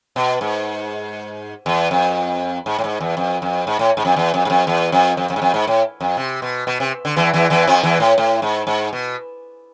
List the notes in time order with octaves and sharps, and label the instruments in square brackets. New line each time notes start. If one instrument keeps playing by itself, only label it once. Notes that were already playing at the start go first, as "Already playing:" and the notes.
[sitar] B2
G#2
E2
F2
G#2
A2
G#2
E2
F2
F2
G#2
A2
G#2
F2
E2
F2
G#2
F2
E2
F2
F2
F2
G#2
F2
G#2
A2
F2
C3
B2
B2
C3
D3
E2 E3
E2 E3
E2 E3
F2 F3
E2 E3
A2
A2
G#2
G#2
B2